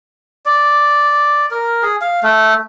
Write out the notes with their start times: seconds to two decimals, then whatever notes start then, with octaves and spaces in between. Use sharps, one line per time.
0.46 D5
1.51 A#4
1.83 G#4
2.01 F5
2.23 A3